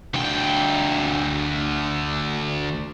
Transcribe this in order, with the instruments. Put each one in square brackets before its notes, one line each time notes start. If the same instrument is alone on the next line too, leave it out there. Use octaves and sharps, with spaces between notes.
[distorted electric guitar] D2 G5